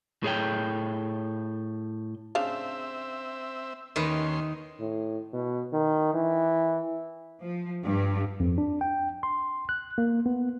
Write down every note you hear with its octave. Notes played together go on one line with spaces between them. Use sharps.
A2 G#4 C#5 G5
C#3 C4 D4 E5 F5
D#2 D#3 C#4 B4 C6
A2
B2
D#3
E3
F3
G2
F2
D4
G5
C6
F#6
A#3
B3